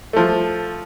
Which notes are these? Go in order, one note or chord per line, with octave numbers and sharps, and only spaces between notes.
F3 A3